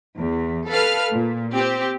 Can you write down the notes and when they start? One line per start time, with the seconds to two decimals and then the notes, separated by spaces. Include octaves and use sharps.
0.17 E2
0.68 A4 B4 F5 F6
1.12 A#2
1.53 C4 G4